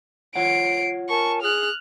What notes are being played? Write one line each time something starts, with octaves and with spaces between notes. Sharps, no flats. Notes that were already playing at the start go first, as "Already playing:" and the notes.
F4 C#5 F#5 C7 D7
A#4 G#5 A5 C#6
G#4 D#6 F6 F#6